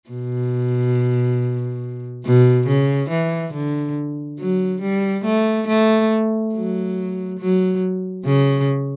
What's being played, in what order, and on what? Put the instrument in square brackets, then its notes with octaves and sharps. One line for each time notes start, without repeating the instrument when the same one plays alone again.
[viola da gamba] B2
B2
C#3
E3
D3
F#3
G3
A3
A3
F#3
F#3
C#3